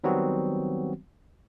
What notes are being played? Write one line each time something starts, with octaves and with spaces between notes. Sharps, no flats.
D#3 F#3 G3 B3 C4 F#4